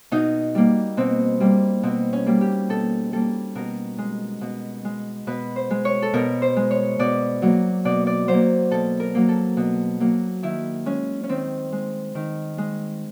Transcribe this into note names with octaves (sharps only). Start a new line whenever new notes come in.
B2 D#4
G3 A#3
B2 C4
G3 A#3
B2 C4
C#4
G3 A#3
G4
B2 A4
G3 A#3 A4
B2 A#4
G#3
B2
G#3
B2 B4
C5
G#3
C#5
A4
B2 A#4
C5
G#3
C#5
B2 D5
F#3 A#3
B2 D5
D5
F#3 C5
A#3
B2 A4
A#4
F#3 A#3
A4
B2
F#3 A#3
D#3 E4
G#3 C#4
C#4
D#3 C4
G#3
D#3
G#3